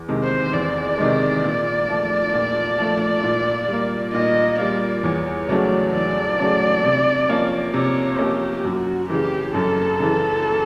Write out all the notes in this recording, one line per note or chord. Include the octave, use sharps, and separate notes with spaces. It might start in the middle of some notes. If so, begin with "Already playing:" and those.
Already playing: E2
C3 D#3 G#3
C5
E2 D5
C3 D#3 G#3
A#2
F3 A3
A#2
F3 A3
A#2
G3
A#3
A#2 D#5
G3 A#3 D5
E2 C#5
C#3 F#3 A3 C#4 D5
E2 D5
C#3 F#3 A3 C#4
C3
F3 A#3 C#4
C3 C#5
F3 A#3 C#4 G4
F#2 F#4
C#3 E3 G4
F#2 A4
C#3 E3